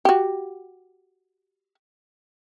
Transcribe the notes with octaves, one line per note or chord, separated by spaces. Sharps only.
F#4 G4